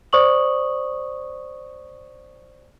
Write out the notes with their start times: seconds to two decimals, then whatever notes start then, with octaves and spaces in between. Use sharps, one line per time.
0.13 C5 D5 C#6 D#6 F#7